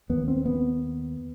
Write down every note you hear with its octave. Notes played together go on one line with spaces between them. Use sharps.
D#2 B3
C4
B3